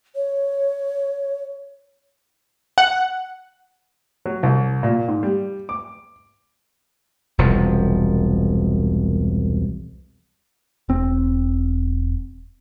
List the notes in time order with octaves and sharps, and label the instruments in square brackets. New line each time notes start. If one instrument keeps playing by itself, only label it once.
[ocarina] C#5
[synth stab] F#5
[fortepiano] F#3
C2
A#2
G#2
G3
D6
[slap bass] E1 C2 F3
[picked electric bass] E1 C4